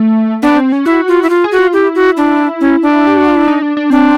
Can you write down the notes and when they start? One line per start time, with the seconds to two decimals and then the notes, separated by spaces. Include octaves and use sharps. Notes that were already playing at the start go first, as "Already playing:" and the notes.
Already playing: A3
0.42 B3 D4
0.57 C4
0.72 C#4
0.86 E4 F#4
1.08 F4
1.23 E4
1.30 F4
1.44 G#4
1.52 F#4
1.59 F4
1.73 E4 G4
1.95 F#4
2.17 D4
2.61 C#4
2.82 D4
3.07 G4
3.17 F#4
3.28 F4
3.37 E4
3.48 D#4
3.62 D4
3.77 D4
3.90 C4 D4